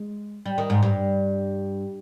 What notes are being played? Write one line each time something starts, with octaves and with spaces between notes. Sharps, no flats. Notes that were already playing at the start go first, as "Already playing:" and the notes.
Already playing: G#3
G3
D#3
G#2
G2